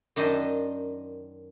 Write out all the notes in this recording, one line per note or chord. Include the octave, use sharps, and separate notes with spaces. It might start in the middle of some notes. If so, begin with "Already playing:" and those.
F#2 D#3 D4 C5 D#5